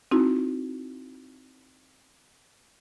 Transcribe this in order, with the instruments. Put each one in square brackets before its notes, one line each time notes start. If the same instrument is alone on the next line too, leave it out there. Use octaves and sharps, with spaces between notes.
[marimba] C4 D#4 E4 F#4